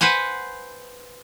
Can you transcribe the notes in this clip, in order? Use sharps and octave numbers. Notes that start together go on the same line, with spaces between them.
B4 C5 F#5 G#5